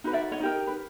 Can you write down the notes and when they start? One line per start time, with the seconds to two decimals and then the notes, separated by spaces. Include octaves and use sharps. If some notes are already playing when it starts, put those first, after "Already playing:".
0.04 D#4 F#4 B4
0.13 D5 E5
0.31 C#5 D#5
0.40 D#4 G4 A#4
0.67 B4